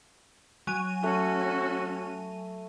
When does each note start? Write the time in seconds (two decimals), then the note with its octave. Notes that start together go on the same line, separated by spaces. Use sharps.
0.67 F#3 G#5 D#7
1.04 A3 C#4 F#4